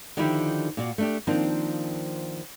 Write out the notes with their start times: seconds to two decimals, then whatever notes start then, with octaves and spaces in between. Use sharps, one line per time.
0.17 D3 D#3 F3 D#4 E4 G4
0.77 A#2 F4 F#4 D5
0.98 A3 D4 G4
1.27 D#3 F3 A#3 C4 D4